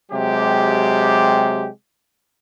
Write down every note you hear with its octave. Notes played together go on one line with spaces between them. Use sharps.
C3 F#3 G#3 G4